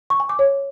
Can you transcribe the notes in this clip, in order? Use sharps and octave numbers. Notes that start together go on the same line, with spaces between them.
C#6
G#5
D6
C#5